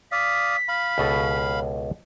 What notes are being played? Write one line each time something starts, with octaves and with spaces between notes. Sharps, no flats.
D5 F5 D#6 B6
F5 B5
C#2 B2 A4